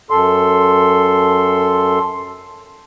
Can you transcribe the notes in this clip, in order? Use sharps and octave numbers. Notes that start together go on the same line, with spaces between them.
F#2 A4 C6